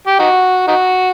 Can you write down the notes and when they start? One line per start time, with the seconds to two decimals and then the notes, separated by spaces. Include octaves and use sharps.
0.07 G4
0.19 D#4 F#4
0.67 D#4 F#4